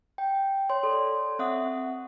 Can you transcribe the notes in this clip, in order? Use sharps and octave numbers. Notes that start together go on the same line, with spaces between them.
G5
C#5 C6
A4 D5
C4 E5 F#5 D#6